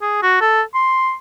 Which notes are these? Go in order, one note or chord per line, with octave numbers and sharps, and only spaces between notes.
G#4
F#4
A4
C6